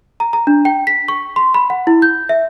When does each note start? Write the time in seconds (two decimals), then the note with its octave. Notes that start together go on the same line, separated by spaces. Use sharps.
0.20 A#5
0.33 A#5
0.47 D4
0.65 G5
0.87 B6
1.08 C#6
1.36 C6
1.54 B5
1.70 F#5
1.87 E4
2.02 G6
2.29 E5